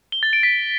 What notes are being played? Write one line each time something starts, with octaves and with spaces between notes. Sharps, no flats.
G7
A6
D7
B6